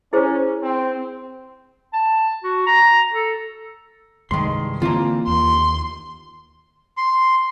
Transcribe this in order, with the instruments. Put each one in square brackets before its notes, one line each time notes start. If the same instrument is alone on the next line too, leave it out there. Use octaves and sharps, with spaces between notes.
[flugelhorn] C#4 [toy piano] E4 G#4 C5
[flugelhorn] C4
[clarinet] A5
F#4
A#5
A4
[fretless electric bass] C2 G2 G#3 [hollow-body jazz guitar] D#3 C6
[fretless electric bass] D3 E3 C4 [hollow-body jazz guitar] A#3 F4
[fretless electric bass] D#2 [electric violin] C6
[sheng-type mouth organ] C6